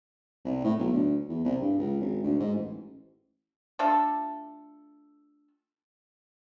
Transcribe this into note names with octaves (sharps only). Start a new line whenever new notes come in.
C2
A2
B1
D2
E2
C2
G2
C#2
G#1
D2
G#2
A1
A3 D4 F4 A4